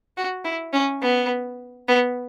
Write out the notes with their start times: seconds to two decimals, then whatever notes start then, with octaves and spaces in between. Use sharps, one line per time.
0.17 F#4
0.45 E4
0.74 C#4
1.02 B3
1.88 B3